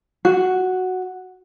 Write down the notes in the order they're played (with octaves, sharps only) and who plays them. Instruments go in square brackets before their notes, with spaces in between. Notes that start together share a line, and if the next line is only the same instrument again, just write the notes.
[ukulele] F#4